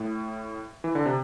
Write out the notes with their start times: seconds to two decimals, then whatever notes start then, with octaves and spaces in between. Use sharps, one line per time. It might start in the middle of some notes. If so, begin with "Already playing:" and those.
Already playing: A2
0.84 E3
0.95 D3
1.06 C3